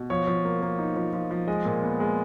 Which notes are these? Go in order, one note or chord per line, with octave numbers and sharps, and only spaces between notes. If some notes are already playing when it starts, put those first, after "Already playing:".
Already playing: B2
F3 C#5
F3
A#3
A#3
D#4
F3
F3
F3
G#3 D#5
A#2
B3
G#3